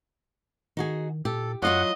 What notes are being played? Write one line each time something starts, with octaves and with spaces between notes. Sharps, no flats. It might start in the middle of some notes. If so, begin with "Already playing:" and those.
D#3 D#4 F#4 G#4
A#2 G4 A4
F#2 F#3 F4 F#4 D#5 F#5